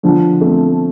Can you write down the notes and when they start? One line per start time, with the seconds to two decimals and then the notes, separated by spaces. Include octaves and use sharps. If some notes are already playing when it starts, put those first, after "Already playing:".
0.03 D3 F3
0.41 A3 C4